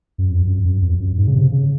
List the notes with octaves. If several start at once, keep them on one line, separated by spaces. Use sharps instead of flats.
F#2
F2
F#2
F#2
F2
F#2
G#2
C#3
C3
C#3